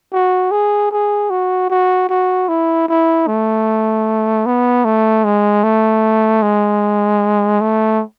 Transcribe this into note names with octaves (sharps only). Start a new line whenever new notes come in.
F#4
G#4
G#4
F#4
F#4
F#4
E4
E4
A3
B3
A3
G#3
A3
G#3
A3